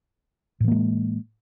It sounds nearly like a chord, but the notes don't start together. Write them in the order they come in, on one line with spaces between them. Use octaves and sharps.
A2 E3 A#3 G#3